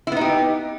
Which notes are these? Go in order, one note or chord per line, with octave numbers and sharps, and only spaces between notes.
B3 D#4 E4 G4